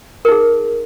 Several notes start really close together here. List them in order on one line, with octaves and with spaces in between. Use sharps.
A#4 D#4 G#4